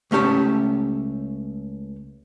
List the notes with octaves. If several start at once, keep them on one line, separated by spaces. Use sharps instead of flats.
C#2 A3 C#4 G4 E5